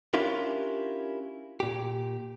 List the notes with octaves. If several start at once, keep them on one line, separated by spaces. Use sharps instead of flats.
C#4 D4 E4 F4 G4 A#4
A#2 G4